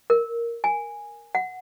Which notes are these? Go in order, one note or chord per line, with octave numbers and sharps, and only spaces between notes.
A#4
G#5
F#5